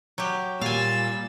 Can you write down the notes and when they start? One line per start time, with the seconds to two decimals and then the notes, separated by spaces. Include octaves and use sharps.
0.18 F#3 G4
0.61 A#2 G3 F5 G#5 E6 A6